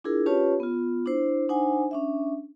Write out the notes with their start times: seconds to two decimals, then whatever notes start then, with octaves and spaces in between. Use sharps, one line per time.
0.04 D4 E4 F4 G#4 A#4
0.26 C#4 F4 G4 B4 C#5 A5
0.60 B3 F4
1.06 D4 E4 C5
1.49 D4 D#4 C5 F#5 G#5
1.91 C#4 D4 E5